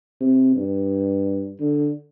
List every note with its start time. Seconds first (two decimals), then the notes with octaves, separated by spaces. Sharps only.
0.21 C3
0.56 G2
1.60 D3